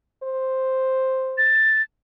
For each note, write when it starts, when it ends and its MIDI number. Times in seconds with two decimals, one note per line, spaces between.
0.23 1.54 72
1.38 1.82 93